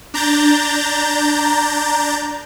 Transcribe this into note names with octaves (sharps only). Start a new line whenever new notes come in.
D4 A#5 G6 A6